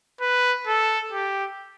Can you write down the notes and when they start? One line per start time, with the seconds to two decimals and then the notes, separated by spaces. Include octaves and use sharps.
0.21 B4
0.67 A4
1.12 G4